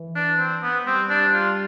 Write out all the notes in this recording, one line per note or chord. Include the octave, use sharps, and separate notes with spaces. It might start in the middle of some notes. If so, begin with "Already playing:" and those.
Already playing: E3
D4
C4
B3
G3 C4
D4
F4